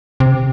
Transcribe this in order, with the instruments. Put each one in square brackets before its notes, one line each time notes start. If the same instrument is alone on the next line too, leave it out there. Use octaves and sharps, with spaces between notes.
[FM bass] C3